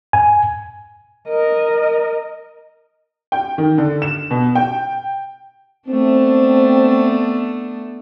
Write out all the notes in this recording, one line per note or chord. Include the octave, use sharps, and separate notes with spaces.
G#5
A#4 D#5
G5
D#3
D3
E7
B2
G5
A3 B3 C4 D4